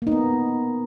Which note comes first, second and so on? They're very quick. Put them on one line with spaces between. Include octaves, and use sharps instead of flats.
A#3 D#4 B3